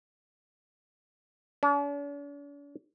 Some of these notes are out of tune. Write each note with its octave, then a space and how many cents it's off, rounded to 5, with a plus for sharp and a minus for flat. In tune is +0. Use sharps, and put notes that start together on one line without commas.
D4 -45